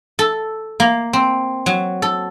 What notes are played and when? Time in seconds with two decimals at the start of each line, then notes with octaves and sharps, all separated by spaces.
0.19 A4
0.80 A#3
1.13 C4
1.66 F#3
2.02 A4